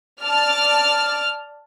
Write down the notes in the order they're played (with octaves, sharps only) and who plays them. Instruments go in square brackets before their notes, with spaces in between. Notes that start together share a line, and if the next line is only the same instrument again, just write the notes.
[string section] D5 A5 [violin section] F6